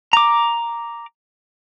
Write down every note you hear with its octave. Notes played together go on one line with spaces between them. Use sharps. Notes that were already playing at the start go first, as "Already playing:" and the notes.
A#5 D6